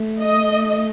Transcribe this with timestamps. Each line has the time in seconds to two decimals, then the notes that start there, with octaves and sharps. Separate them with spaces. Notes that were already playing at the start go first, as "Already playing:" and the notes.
Already playing: A3
0.20 D#5